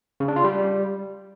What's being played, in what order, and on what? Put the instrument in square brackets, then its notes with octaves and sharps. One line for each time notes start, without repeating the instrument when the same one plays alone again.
[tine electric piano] C#3
D4
F4
G3